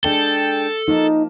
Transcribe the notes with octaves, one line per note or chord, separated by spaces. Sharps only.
G#3 D4 G#4 A4 G5
F3 A#3 D#4 A5